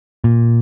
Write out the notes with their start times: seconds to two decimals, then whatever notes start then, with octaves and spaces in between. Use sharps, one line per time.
0.24 A#2